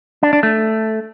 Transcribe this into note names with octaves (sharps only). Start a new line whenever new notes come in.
D4
D4
A3